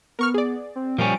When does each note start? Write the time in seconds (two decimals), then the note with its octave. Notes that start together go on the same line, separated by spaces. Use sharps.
0.19 B3 A#4 C#6 F6
0.34 G#4 D5
0.76 C4
0.99 A#2 F3 G3 C#4 D7